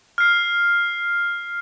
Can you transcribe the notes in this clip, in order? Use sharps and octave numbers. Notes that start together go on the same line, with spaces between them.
F6 C7